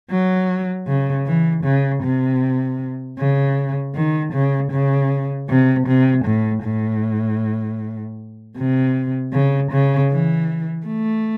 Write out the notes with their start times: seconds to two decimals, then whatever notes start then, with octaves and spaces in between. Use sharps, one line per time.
0.10 F#3
0.87 C#3
1.26 E3
1.65 C#3
2.03 C3
3.19 C#3
3.96 D#3
4.33 C#3
4.72 C#3
5.49 C3
5.87 C3
6.25 A2
6.64 A2
8.57 C3
9.33 C#3
9.72 C#3
10.11 E3
10.87 A3